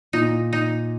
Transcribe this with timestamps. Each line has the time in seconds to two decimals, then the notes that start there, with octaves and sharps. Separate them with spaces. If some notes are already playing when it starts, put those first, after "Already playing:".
0.13 A#2 D#4
0.53 D#4